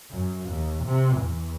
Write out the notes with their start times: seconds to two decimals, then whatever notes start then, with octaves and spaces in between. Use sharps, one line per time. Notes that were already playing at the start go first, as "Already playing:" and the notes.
0.11 F#2
0.49 D#2
0.84 C3
1.17 E2